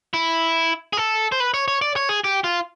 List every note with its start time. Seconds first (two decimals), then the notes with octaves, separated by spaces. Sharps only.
0.14 E4
0.93 G#4
0.97 A4
1.32 C5
1.40 B4
1.54 C#5
1.68 C#5
1.82 D5
1.96 C#5
2.09 G#4
2.24 G4
2.44 F4